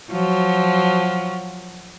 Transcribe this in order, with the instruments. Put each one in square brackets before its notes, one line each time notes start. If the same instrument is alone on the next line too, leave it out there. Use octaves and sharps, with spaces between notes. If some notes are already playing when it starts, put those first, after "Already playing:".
[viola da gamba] F3 F#3